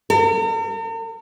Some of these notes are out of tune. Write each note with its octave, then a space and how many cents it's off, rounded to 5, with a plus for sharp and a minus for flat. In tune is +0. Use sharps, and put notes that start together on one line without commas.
A#4 -45